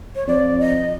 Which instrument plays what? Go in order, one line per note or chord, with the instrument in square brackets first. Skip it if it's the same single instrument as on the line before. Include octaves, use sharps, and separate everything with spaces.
[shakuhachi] C#5
[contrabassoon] F2 [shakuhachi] D5
[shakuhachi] D#5